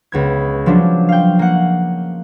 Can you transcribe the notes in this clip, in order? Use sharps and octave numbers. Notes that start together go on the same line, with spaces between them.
C#2 B3 G#6
F3 F#3 C#4 D4
F5 G5
A#3 F#5